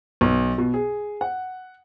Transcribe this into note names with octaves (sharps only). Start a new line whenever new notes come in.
B1
B2
G#4
F#5